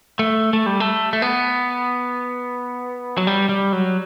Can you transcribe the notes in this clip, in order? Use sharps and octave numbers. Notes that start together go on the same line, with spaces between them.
A3
A3
G3
A3
A3
B3
F#3
G3
G3
F#3